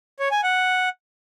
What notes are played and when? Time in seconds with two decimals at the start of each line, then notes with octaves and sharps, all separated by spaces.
0.19 C#5
0.31 G#5
0.43 F#5